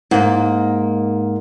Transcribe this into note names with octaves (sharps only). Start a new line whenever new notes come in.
G#2 A#3